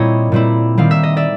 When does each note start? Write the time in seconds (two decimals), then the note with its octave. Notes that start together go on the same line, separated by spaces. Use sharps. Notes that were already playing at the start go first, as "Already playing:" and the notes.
Already playing: A#2 G3 C4 E4 C#5 D#5
0.32 A#2 G3 C4 E4
0.77 D#3 G3 C4 F5
0.91 E5
1.03 D#5
1.16 D5 E5